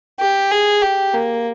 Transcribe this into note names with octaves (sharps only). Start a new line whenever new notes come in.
G4
G#4
G4
A#3